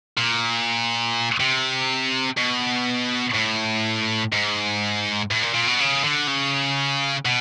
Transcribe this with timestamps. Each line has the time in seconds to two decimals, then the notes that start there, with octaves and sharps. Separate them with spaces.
0.17 A#2
1.40 C3
2.37 B2
3.35 A2
4.32 G#2
5.31 A2
5.43 A#2
5.55 A#2
5.67 B2
5.80 C#3
6.04 D3
6.28 C#3
7.25 B2